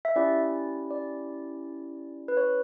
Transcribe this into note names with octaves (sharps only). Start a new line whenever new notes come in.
E5
C#4 E4 G4 D5
D5
B4
C#5